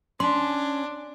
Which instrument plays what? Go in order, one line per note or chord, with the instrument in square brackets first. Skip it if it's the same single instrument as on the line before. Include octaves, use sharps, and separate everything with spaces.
[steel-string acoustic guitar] C#4 [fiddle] D4 [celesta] C6